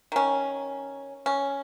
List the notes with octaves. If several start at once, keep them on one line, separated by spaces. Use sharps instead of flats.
D#3 C#4
C#4